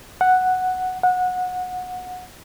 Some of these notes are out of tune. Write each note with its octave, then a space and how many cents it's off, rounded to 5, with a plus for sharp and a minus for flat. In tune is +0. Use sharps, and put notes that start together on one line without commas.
F#5 +0
F#5 -20